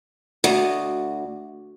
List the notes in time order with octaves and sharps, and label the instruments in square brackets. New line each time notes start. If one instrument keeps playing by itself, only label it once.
[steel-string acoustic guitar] D2 [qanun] F#4 D5 D#5